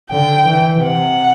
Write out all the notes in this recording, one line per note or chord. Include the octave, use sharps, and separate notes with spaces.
D3 G5
E3
C3 F#5